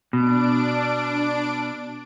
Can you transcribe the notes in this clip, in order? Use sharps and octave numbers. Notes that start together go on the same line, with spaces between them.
B2 D4 D7